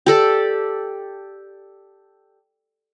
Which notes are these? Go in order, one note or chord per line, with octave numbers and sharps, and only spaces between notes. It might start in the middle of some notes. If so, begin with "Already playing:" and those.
G4 A4 D5